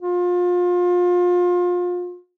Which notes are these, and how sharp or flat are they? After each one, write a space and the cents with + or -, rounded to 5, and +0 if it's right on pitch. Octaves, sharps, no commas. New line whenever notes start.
F4 +30